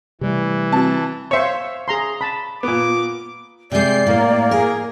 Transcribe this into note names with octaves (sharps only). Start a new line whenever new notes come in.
C3 E3 G3 A3
C4 F#4 A5
C5 C#5 E5 F5 C#6
G#4 A#5 C6
A5 B5
A#2 B3 D6
C3 G#3 D5 G6 C7
A2 A#3
G#4 A#4